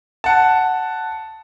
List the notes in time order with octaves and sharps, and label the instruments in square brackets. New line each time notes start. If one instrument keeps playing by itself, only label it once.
[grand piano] F#5 A5